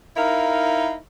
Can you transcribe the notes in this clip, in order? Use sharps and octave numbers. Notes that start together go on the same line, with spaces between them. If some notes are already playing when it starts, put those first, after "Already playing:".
D#4 E4 A#4 F5